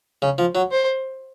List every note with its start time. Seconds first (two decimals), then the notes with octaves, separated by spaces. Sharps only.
0.22 C#3
0.38 F3
0.55 F#3
0.71 C5